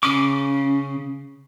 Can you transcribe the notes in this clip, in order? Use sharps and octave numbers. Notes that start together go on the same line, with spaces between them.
C#3 C#4 D6